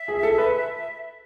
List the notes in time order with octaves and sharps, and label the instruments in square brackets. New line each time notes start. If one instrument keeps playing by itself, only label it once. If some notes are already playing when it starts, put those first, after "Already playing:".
Already playing: [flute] E5
[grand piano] G#4
A4
B4